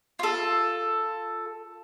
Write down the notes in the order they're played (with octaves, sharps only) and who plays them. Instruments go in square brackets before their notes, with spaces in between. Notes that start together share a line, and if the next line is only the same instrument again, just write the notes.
[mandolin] F4 A4